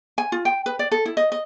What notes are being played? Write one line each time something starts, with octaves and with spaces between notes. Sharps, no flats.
G#5
F4
G5
B4
D5
A4
E4
D#5
D#5